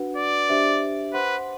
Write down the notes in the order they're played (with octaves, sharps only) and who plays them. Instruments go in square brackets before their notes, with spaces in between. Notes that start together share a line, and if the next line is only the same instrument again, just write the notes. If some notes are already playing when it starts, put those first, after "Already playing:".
Already playing: [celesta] D4 F#4 B4 F#5
[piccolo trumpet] D5
[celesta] D4 G4 C5 E5
[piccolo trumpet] B4 [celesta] C5 F#5 C6